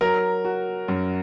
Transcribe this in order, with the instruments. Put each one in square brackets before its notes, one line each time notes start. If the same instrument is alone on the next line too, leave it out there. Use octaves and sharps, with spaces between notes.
[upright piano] F#3 [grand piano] A#4
[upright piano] F#4
F#2